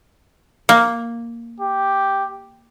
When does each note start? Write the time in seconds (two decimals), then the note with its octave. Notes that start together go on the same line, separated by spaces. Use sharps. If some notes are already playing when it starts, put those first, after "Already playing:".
0.69 A#3
1.60 G4